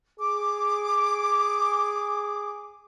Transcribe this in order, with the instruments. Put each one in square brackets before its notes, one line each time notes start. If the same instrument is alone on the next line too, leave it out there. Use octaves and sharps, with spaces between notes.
[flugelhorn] G#4 [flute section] D6